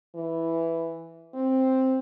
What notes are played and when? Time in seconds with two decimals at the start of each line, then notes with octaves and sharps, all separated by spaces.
0.15 E3
1.34 C4